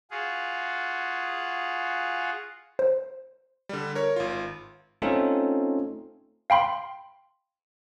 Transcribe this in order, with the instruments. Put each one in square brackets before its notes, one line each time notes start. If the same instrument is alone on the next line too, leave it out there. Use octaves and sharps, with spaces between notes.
[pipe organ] F4 F#4 G#4
[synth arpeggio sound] C5
[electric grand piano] D3 G3
A#4 C#5
G#1 F4
[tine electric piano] A3 C4 C#4 D#4 F4 A4
[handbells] F5 G5 B5 C6